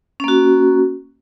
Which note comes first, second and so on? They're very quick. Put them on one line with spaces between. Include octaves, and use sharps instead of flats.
C#4 A#3 F#4